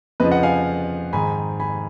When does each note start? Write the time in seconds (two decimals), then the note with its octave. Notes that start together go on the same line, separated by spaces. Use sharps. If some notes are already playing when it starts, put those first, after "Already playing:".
0.20 F2 C#3 F3 B4 D#5
0.31 D#5 F#5
0.43 F5 G#5
1.13 G#2 D#3 G#5 B5
1.60 G#5 B5